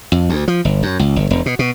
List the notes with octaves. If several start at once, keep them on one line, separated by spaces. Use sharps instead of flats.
F2
D2
F3
G1
F#2
C#2
G1
E1
B2
B2